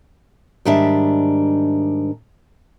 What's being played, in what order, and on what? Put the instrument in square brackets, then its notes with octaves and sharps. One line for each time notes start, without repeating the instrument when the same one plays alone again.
[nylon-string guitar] G#2 D#3 G3 D4 E5